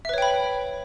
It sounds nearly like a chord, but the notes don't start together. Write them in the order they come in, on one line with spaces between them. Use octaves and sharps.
E5 B4 C#5 G5 B5